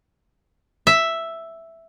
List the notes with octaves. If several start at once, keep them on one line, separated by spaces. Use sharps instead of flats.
E5